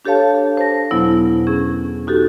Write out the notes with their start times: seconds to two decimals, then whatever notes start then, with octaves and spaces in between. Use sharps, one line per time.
0.05 D4 G4 A4 C#5 F5 A5
0.57 C5 A5 A#6
0.91 E2 B2 F#3 B3 E4
1.08 E4
1.47 C#4 G#4
2.07 D#4 F#4 G4 A4